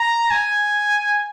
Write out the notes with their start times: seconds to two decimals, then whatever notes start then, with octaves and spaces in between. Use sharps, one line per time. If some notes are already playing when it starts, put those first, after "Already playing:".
Already playing: A#5
0.31 G#5